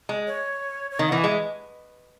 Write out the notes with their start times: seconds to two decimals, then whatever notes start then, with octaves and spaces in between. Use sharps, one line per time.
0.09 G#3
0.27 C#5
0.91 C#5
0.99 D#3 D#5
1.09 F#5
1.12 E3
1.18 G#5
1.24 G#3 E5